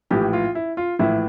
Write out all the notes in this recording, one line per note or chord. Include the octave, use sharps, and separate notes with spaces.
A#1 A2 E3 G4
F4
E4
F4
A#1 A2 E3 E4